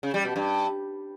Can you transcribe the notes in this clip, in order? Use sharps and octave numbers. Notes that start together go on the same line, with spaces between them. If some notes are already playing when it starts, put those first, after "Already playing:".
C#3
G3
B2
G2